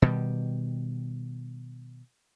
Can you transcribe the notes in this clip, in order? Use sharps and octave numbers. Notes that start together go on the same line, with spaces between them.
B2 D#3 G3